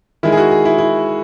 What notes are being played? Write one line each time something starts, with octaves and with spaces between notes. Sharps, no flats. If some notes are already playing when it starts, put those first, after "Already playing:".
D#3 G#3 E4
G#4
F#4
G#4
E4
E4